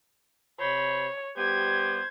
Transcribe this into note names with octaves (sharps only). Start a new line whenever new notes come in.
C3 C5 C#5 B5
G3 B3 G4 C5 G#6